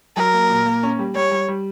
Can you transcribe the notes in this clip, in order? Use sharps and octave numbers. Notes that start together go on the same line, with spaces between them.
F#3 A#4
A#3
A#2
A#3
C#4
G3
G3 C#5
G3
G3